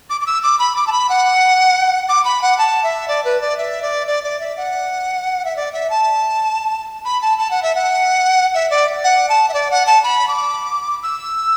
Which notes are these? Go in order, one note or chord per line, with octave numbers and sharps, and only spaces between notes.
D6
D6
E6
D6
B5
D6
A5
B5
F#5
D6
B5
F#5
A5
E5
D5
B4
D5
E5
D5
D5
D5
E5
F#5
E5
D5
E5
A5
B5
A5
A5
F#5
E5
F#5
E5
D5
F#5
A5
E5
D5
F#5
A5
B5
D6
E6